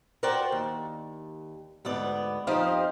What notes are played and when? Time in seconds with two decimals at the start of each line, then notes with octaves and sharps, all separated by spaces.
0.23 F#4 A#4 C5 D5 F#5 G5
0.52 D#2
1.85 D2 G#2 B3 D5
2.47 F2 F3 D#4 G4 C5 F5